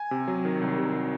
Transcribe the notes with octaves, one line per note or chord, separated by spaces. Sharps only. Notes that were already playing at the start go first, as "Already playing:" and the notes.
Already playing: G#5
C3
F#3
D#3
C2
C3